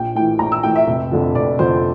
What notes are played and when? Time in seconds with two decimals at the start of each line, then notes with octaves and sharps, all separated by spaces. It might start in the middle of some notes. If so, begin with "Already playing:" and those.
Already playing: A#1 G5
0.15 A2 E3 G5
0.39 A#1 A#5
0.52 E6
0.63 A2 E3 G5
0.76 E5
0.87 F1
1.11 F2 D3 F3
1.35 F1 D5
1.59 F2 D3 F3 C5